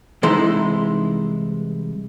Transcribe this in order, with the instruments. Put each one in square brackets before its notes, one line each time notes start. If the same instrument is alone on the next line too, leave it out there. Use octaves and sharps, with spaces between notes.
[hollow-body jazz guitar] C2 E3 G#3 D#4 E4 C6